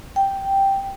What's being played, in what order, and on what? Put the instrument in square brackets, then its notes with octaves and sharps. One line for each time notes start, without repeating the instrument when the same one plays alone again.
[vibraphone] G5